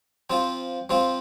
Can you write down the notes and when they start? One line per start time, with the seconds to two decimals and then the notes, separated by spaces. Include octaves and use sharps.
0.30 F3 C4 F4
0.89 F3 C4 F4